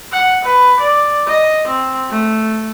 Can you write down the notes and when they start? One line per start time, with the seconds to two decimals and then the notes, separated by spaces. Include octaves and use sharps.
0.12 F#5
0.45 B4
0.80 D5
1.27 D#5
1.67 C4
2.10 A3